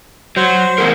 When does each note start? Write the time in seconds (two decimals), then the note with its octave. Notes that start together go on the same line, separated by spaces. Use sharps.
0.36 F#3 C5
0.78 E2 G#4 A#4